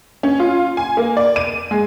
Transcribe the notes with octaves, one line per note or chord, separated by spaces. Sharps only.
C#4
F4
G#5
A#3
D5
D#7
G#3